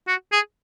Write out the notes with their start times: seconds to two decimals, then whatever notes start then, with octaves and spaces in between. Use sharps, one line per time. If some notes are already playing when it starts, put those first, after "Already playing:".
0.07 F#4
0.32 G#4